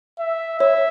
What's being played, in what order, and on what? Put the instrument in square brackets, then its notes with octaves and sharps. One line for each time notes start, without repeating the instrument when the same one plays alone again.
[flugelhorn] E5
[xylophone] C#5 [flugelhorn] E5